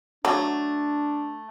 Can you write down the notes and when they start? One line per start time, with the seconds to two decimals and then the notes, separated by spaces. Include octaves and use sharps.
0.25 F#3 A3 D4